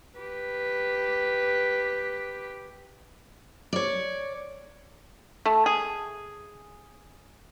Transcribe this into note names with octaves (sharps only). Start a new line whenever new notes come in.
G4 B4
C#5 D5
A3
G#4